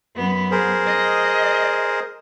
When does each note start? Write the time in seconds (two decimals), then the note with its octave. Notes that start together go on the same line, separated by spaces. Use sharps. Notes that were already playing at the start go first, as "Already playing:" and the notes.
0.15 F#2 B3
0.51 G#4 A#4 C5
0.86 D#5